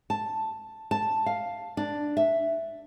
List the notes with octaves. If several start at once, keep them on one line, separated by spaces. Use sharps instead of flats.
A5
A5
F5
D4
E5